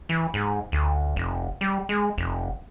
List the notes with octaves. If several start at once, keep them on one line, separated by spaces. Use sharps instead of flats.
E3
G#2
D2
F1
G3
G#3
F1